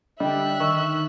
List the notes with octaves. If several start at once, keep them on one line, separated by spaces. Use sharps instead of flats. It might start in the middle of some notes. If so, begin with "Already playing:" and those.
D3 G3 D#5 E5 G5 F#6
D#3 C#6 E6